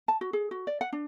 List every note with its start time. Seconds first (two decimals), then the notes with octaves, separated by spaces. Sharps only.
0.08 A5
0.21 F#4
0.33 G#4
0.51 F#4
0.67 D5
0.81 F#5
0.93 D4